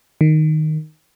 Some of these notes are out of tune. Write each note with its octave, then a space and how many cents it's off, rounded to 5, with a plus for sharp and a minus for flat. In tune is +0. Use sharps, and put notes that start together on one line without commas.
D#3 -5